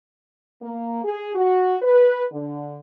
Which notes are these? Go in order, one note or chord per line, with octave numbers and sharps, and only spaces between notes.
A#3
G#4
F#4
B4
D3